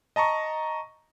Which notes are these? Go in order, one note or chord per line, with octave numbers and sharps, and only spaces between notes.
D#5 A5 A#5 C#6